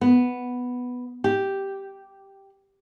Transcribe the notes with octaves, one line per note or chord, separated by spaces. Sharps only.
B3
G4